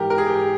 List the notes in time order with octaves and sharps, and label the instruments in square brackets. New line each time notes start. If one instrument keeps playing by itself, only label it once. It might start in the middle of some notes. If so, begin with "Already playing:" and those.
Already playing: [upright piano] G#2 E3 G4 A#4
A#4
G#4
G4